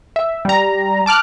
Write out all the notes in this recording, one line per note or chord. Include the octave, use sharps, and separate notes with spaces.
E5
G3 A#5
A5 D6 F6 F#6